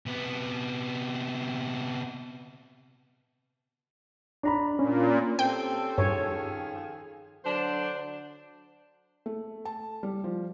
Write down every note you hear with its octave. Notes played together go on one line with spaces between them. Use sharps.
C3 B3
D4 A#5 B5
A#2 C#4
C4 C#4 G4 A4 G5
G2 D#3 F3 G#4 C#5
D3 F#3 D4 C5
A3
A5
G3
F3